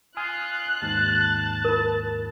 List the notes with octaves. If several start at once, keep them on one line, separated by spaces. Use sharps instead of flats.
F4 G#5 D#6 F6 F#6
D#2 G#2 A5
F4 A#4